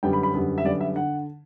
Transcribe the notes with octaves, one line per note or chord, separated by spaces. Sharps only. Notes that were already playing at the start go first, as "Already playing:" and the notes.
F#2 D3 G3 B3 G5
B5
B5
F#2 D3 G3 B3
E5
F#2 D3 G3 B3 D5
E5
D3 F#5